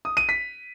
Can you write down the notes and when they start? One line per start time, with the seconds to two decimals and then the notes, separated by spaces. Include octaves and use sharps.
0.05 D#6
0.17 D#7
0.29 B6